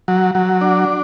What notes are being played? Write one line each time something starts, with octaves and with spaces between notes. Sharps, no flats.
F#3
F#3
D4